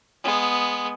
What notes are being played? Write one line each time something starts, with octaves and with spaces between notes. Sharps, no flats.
G#3 B3